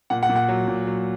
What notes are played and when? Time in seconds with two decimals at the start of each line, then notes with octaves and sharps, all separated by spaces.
0.10 A#2 F#5
0.23 F#5
0.29 A#2
0.36 F#5
0.48 F#3
0.68 A#2
0.87 F#3